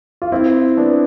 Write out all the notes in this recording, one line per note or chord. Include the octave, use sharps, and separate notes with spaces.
F4
C4 E4
B3 D4